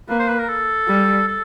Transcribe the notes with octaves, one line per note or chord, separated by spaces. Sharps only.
A#3 B4
C5
B4
A#4
A4
G3
A4